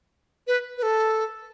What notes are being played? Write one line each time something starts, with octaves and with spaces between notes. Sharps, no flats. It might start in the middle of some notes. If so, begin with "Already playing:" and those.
B4
B4
A4